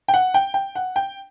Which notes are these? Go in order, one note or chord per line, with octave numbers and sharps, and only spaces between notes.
G5
F#5
G5
G5
F#5
G5